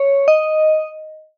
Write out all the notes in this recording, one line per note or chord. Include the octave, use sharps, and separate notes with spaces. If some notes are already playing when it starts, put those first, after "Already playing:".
Already playing: C#5
D#5